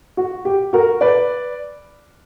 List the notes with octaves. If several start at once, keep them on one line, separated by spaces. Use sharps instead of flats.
F#4
G4
F#4 A#4
B4 D5